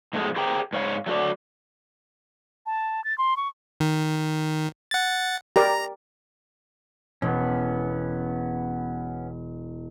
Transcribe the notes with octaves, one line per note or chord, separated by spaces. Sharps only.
G#2 B2 F3 G#3 A3 G#4
G4 G#4 A#4 C5 G5
G#2 C#5 F5
F#3 A3 F#4 D5
A5
A6
C6
C#6
D#3
F#5 A6
G4 A#4 D5 A#5
E1 B3 C#4